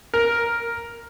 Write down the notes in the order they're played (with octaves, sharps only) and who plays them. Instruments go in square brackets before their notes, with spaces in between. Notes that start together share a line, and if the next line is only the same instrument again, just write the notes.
[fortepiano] A#4